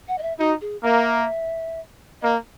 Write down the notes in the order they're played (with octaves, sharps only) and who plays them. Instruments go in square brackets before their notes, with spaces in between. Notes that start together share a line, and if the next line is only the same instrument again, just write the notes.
[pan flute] F#5
D#5
E5
[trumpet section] D#4 [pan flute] F#4
[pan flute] G#4
[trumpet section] A#3 [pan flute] E5
[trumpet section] A#3 [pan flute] D#5